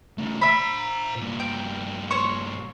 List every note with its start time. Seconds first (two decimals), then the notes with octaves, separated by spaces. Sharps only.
0.18 C#3 A3
0.41 C5 E5 A#5 B5
1.16 G2 A#2
1.40 G5
2.11 C5 C#5 C#6